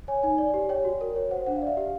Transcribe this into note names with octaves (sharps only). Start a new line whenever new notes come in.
C#5 G#5
D#4 G#5
D5
G4
C#5 G5
F#4
A#4
C#5
C5 F#5
D4 F#5
F5
D5
E5
G4 F5